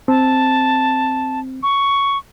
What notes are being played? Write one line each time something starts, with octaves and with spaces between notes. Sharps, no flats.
C4 A5
C#6